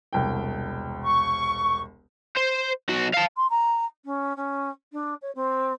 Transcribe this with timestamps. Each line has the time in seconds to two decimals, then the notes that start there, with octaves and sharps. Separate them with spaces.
0.13 E1 C2 G5
1.03 C#6
2.36 C5
2.89 B1 F#4
3.14 F5 A5
3.37 C6
3.50 A#5
4.05 C#4
4.37 C#4
4.92 D4
5.22 C#5
5.35 C4